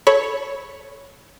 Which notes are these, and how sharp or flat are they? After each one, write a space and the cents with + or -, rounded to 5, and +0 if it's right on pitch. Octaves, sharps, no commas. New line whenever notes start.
A4 -15 C#5 +0 B5 +0